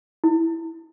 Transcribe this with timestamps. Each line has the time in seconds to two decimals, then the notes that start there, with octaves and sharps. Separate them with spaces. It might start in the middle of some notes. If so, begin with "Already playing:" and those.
0.24 E4